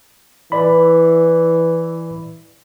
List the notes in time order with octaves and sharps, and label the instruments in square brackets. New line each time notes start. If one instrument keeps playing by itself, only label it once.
[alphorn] E3 [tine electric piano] B4 D5 B5